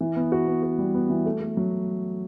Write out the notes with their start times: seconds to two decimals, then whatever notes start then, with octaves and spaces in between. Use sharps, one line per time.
0.01 E3
0.16 B3
0.32 F#4
0.47 B3
0.63 F#4
0.78 G3
0.94 B3
1.10 E3
1.26 A3
1.41 A3
1.57 F#3